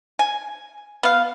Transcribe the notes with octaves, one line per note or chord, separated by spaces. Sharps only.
G#5
B3 F5